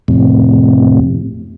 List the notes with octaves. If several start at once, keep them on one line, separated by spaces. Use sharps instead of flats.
F2 A2 C3